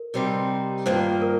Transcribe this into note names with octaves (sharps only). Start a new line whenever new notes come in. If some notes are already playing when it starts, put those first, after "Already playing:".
Already playing: A#4
C3 G3 C4 D#4
G2 D#3 A#3 F4 C5
A#4